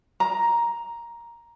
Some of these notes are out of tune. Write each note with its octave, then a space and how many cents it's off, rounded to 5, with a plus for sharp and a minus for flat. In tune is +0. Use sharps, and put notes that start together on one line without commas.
A#5 +10